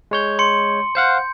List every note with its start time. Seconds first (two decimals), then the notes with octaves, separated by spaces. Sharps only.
0.11 G#3 C#5 G6
0.39 C6 C#7
0.95 C5 F5 F#5 G6